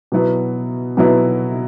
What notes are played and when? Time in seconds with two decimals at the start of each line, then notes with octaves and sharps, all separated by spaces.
0.12 B2 F#3 B3 E4
0.97 B2 F#3 B3 E4